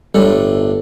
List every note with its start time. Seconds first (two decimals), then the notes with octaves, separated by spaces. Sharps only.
0.14 G1 A2 G3 D4 A4